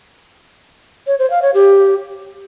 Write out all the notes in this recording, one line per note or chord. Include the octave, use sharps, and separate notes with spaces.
C#5
C5
F5
C#5
G4